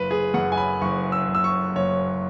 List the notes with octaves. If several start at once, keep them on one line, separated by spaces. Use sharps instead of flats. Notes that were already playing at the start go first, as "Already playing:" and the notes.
Already playing: F#1 B4
G#4
F#2 F#5
G#5
B5
F#1 C#6
E6
F#1
E6
C#6
F#1 C#5